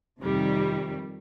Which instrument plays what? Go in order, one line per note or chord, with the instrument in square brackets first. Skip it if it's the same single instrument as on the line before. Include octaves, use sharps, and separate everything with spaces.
[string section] F2 C3 D#3 G3